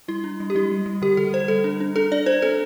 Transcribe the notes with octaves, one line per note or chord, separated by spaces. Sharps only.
G3 E4
D4
G3
G4
G3 E4
G3
G3
D3 G4
D3 A4
D3 C5
G3 A4
D4
D4
D4 A4
D4 D5
D4 C5
C4 A4